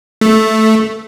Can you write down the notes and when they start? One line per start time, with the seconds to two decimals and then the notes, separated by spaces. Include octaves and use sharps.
0.21 A3